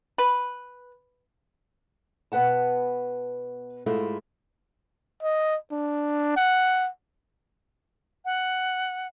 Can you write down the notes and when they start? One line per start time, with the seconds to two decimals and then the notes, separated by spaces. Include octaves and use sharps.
0.18 B4
2.32 B2 B3 B4 F#5 A5
3.86 G#2 G#3 A3 E4 F4
5.23 D#5
5.72 D4
6.36 F#5
8.25 F#5